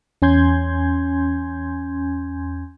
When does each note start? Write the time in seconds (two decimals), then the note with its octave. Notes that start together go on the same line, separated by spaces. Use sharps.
0.22 E2 C#4 G#5 C6 G6 G#6